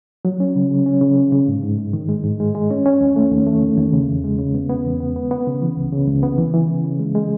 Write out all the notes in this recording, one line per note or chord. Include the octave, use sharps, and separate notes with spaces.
F#3
C#4
C#3
C#3
C#4
C#3
C#3
C#3
G#2
G#2
G#3
D#3
G#3
G#2
G#3
G#3
C#4
C#4
D#2
A3
D#2
A3
D#3
D#2
C#3
E2
G#3
C#3
B3
B3
E2
B3
B3
B3
C#3
E3
C#2
C#3
C#2
B3
E3
E3
C#3
C#3
G#3
G#3